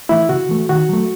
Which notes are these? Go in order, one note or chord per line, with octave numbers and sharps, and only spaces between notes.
E3 A3 E4
C#3 F#4
E3 A3
D#3 F#4
F#3 A3